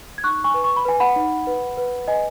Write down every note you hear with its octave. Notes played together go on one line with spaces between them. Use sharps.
G#6
D#4 C#6 F#6
G#5 C#6
B4
C#6
B5
B4 G#5
F#5 B5
D#4
B4
B4
B4 D#5 G#5